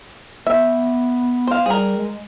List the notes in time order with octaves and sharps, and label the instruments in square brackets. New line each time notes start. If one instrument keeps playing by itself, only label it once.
[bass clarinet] B3 [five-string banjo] E5
[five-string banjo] C5 F5
[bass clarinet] G3 [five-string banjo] G#4 A#4
[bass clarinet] G#3